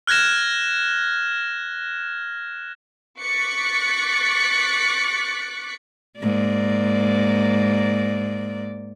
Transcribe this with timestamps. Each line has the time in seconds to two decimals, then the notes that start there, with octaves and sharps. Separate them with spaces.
0.07 F6 F#6 G#6 A#6 E7
3.22 C#6 D6 F#6 A6 B6 C#7
6.19 G#2 A#3 D5